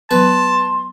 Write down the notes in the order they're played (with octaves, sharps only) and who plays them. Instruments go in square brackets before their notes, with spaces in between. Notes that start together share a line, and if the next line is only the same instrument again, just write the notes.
[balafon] F#3 B3 [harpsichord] B4 [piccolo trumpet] A5 [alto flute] C6